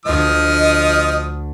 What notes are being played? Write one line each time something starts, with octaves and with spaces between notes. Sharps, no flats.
D2 F3 A3 D#5 D#6 F6